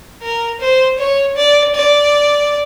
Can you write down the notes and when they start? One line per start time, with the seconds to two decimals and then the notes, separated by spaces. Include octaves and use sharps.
0.22 A#4
0.61 C5
0.98 C#5
1.37 D5
1.75 D5